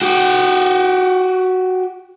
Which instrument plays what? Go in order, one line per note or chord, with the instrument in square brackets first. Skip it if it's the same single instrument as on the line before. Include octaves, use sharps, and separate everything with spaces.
[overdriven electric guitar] F#4 G4